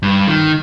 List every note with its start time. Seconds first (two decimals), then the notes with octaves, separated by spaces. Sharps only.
0.03 G2
0.27 D#3